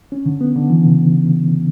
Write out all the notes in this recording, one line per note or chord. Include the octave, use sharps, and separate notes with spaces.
C#4
D3
B3
D3
E3
C#3